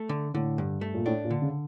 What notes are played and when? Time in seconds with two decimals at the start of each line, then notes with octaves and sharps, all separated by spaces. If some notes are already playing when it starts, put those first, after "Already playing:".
Already playing: A3
0.09 D3
0.34 A2 D3
0.58 G2
0.81 A3
0.94 A#2
1.06 A2 D4
1.24 A#2
1.31 D3
1.42 C#3